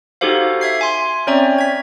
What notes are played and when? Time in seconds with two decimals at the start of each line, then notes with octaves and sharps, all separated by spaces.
0.21 D#4 F#4 G4 A4 C5 F5
0.61 E5 G#6 C7
0.81 G#5 C6
1.27 C4 C#4 C#5 D5 E5 A#5
1.58 G#6 B6